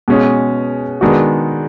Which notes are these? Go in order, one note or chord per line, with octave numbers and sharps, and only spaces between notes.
B2 G#3 C#4
D#3 G#3 B3 D4 F#4